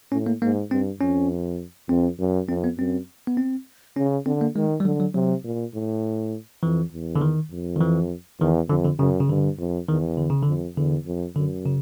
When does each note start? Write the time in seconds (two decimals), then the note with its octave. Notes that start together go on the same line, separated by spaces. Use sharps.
0.12 A2 C#4
0.26 A#3
0.42 G#2 A#3
0.71 G2 C4
1.01 F2 C#4
1.89 F2 C4
2.20 F#2
2.49 F2 C4
2.64 B3
2.78 F#2 C4
3.27 B3
3.37 C4
3.96 C#3 C#4
4.26 D3 C4
4.41 A#3
4.56 D#3 G#3
4.80 G3
4.85 D3 F#3
5.00 F#3
5.14 C3 F#3
5.44 A#2
5.74 A2
6.63 F2 E3
6.92 E2
7.16 D3
7.21 D#3
7.51 F2
7.76 D#3
7.81 E3
8.40 E2 D#3
8.69 F2 D3
8.84 D3
8.99 F#2 C#3
9.20 C#3
9.29 G2 D3
9.59 F2
9.88 E2 D#3
10.17 D3
10.30 C#3
10.43 F2 D3
10.77 E2 D3
11.06 F2
11.36 F#2 D3
11.66 C#3